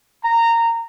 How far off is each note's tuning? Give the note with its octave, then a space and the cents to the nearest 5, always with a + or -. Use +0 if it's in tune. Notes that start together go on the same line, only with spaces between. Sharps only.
A#5 -15